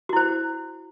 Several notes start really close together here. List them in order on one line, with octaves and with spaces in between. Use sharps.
F#4 E4 C5